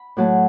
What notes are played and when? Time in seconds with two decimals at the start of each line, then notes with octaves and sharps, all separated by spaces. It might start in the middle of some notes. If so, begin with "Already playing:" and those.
Already playing: B5
0.17 A2 F#3 A3